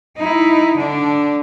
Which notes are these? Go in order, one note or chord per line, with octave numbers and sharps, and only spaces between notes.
D#4 E4
D3 D4